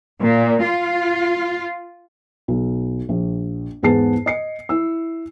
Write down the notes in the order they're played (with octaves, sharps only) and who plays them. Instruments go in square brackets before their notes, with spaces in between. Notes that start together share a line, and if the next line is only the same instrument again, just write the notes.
[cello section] A#2
F4
[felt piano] B1
A#1
E2 G#2 B3 G#4 A5 C7
D#5 C7 C#7
E4 E6